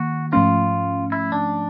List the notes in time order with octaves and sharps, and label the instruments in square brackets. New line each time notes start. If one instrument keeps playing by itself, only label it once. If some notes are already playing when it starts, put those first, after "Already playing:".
Already playing: [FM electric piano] D#3 A#3 [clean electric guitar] F#4
[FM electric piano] G#2 F3 A3 C#4 [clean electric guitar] F4
[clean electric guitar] E4
D4